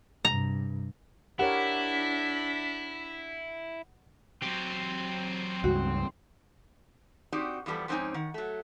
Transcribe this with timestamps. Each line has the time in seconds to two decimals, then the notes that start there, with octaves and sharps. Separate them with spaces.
0.25 G2 C3 A#5
1.39 D4 E4 G4 A#4 C#5 F#5 B6
4.42 F#3 C4 G4
5.64 C#2 G2 F#4
7.32 C4 D#4 F#4 G4 D5
7.66 E2 F3 G3 B3 A4
7.88 F2 G#2 C4 C#4 D#4 G#5
8.14 D#3 F#5
8.34 F#3 A3